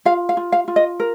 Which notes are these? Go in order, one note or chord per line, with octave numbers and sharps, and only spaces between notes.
F4 F5
F5
F4
F5
F4
D#5
A#4